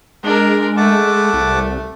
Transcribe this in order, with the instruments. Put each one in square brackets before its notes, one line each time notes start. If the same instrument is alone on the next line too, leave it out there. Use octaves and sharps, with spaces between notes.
[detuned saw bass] G#3 [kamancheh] D4 A#4
[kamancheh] A3 [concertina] F#5 A5 D6
[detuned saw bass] C2